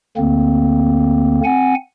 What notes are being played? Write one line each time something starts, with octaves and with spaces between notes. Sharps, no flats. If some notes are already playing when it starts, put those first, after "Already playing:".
D2 D3 A#3 C4
C4 F#5 G#5